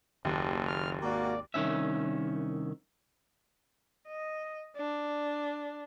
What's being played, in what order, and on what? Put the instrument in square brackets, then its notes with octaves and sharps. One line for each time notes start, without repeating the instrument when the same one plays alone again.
[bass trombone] F#1 [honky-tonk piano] D#2
[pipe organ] F6
[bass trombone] G#1 [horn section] A#3 F#4 [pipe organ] D5
[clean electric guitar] C2 G2 D#3 C#4 E5
[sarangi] D#5
D4